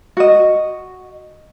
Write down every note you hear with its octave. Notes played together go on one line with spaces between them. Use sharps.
F#4 D#5